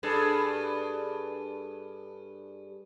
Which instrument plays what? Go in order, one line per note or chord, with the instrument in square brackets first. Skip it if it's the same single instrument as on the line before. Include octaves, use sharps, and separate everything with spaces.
[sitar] G2 G#4 A4